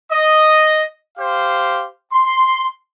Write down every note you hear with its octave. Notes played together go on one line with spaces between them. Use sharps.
D#5
G4 C5 F5
C6